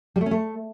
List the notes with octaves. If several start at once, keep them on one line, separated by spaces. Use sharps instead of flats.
G3
A3
C#4
A3